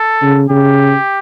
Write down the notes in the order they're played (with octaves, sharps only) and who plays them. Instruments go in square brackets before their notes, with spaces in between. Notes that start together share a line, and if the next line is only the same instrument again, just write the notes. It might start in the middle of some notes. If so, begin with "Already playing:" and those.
Already playing: [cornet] A4
[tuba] C#3
[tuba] C#3 [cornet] G4